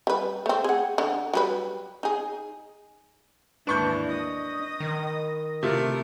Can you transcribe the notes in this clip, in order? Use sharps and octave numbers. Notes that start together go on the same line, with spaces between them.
G3 B4
A3 C4
G#4 F#5
D3
F#3 G3 B4
D#4 G#4
D#2 G#2 E3 D4 B4 C#6 G6
D#5 D#6
D#3
C3 A3 F4 A#4